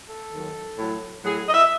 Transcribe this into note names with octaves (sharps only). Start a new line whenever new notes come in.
A4
D#2 D#3 F#3
A2 F#3
A2 F#3 G#4
D#5
E5